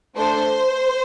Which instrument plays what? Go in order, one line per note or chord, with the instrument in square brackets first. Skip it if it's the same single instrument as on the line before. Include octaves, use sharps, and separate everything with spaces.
[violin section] A3 D4 A4 C5